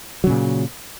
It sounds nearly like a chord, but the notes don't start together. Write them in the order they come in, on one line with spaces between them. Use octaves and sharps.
F#3 C#3 A#2